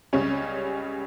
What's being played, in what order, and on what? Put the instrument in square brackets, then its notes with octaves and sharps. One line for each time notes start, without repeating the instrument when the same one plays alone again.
[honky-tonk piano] C#2 C#3 G3 C#4 C#5